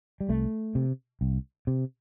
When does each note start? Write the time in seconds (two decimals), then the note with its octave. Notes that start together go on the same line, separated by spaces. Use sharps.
0.21 G3
0.29 C2 A3
0.75 C3
1.21 C2
1.67 C3